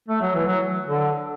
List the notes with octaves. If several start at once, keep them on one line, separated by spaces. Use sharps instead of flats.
A3
F#3
E3
F#3
D3